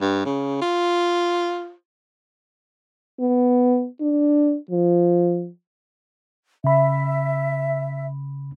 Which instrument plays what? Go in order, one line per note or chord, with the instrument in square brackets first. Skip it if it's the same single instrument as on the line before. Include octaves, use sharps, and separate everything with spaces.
[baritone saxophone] G2
C#3
F4
[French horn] B3
D4
F3
[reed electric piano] C#3 B5 [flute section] E5